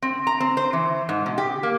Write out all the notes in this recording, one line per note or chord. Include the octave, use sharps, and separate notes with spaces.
C4
A#5
C4
C5
E3
G#2
B2
G4
A#3